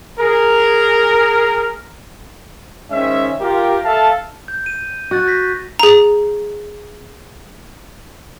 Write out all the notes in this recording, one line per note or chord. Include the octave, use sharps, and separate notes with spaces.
G#4 A#4
D#3 G#3 C#4 C5 E5
F4 G4 A#4
A4 E5 F5 A5
G6
D#7
F#4 C#6 F#6 A6
G6 A#6 B6
G#4 A#5